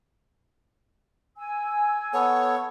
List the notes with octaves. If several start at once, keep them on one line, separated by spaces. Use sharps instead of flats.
G#5 E6
B3 A4 C#5